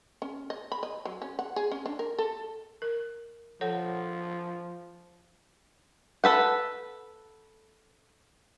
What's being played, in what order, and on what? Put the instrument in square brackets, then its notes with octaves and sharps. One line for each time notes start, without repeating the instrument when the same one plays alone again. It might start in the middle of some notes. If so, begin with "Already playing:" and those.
[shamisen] C#4
D#5
B5
D#5
F#3
C#4
F#5
G#4
C#4
D4
A#4
A4
[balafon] A#4
[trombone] F3 [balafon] A4 C#5 F#5
[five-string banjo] A4 B4 F#5